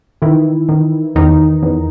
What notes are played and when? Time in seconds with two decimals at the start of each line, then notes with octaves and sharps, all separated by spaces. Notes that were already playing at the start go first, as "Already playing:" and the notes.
0.22 D#3 E3 E4
0.69 D#3
1.15 E2 D#3 D#4
1.63 E2